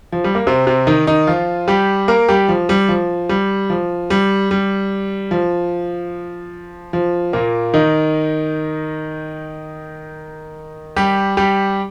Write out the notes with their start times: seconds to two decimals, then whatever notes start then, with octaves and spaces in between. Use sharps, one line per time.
0.12 F3
0.24 G3
0.35 A#3
0.47 C3 C4
0.67 C3 C4
0.87 D#3 D#4
1.07 D#3 D#4
1.27 F3 F4
1.68 G3 G4
2.08 A#3 A#4
2.29 G3 G4
2.49 F3
2.69 G3
2.89 F3
3.29 G3
3.70 F3
4.10 G3
4.51 G3
5.31 F3
6.93 F3
7.33 A#2 A#3
7.74 D#3 D#4
10.96 G3 G4
11.37 G3 G4